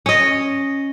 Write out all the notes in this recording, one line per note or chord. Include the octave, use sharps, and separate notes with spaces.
C#4 D#5